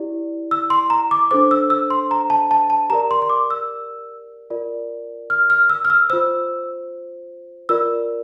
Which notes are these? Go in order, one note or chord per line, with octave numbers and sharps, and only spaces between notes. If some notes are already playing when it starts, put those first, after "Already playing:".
Already playing: E4 G4 D5
E6
C6
A#5
D6
D4 A4 C5 D6
E6
E6
C6
A#5
A5
A5
A5
G4 A#4 D5 A#5
C6
C6
D6
E6
F4 A#4 D5
F6
F6
E6
F6
E6
F4 C5 E6
F4 A#4 D5 E6